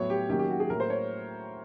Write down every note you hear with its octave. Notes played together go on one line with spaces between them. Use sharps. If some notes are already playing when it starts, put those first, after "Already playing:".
Already playing: A2 F#3 B3 C#5
G4
D#3 F#3 A#3 C#4 G4
G4
F#4
G#4
A2 F#3 A#3 A#4
C5
C#5